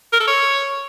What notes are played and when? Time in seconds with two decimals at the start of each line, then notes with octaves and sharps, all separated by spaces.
0.13 A#4
0.20 A4
0.27 C#5